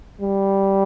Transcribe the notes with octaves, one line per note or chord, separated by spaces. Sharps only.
G3